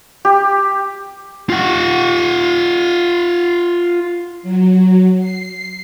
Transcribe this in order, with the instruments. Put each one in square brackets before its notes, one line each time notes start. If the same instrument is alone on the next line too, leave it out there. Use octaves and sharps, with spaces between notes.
[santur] G4
[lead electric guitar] F4 F#5
[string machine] F#3
C7